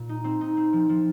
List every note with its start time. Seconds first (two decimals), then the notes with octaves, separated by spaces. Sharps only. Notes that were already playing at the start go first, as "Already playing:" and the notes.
Already playing: A#2
0.09 D#4
0.24 C4
0.41 D#4
0.57 C4
0.73 F3
0.89 F3